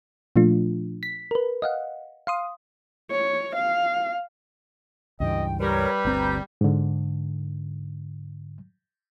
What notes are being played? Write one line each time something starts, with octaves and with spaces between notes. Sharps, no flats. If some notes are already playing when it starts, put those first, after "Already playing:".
A#2 F3 A3 D4 F4
B6
A#4 B4
D#5 F5 F#5
F5 C6 D#6
C#5
F5
C#2 G2 E3 D#5 G5
G3 A#4 B4 C#5 A#5
G1 D2 C4 D5 A#5 G6
G#2 D3